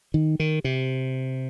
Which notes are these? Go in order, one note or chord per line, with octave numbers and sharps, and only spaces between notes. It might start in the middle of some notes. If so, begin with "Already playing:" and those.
D#3
D#3
C3